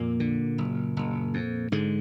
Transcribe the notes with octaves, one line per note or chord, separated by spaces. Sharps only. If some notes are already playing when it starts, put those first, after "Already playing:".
Already playing: F2 A#2 A#3
D3
F#1
F#1
F2
G#2 D3 G#3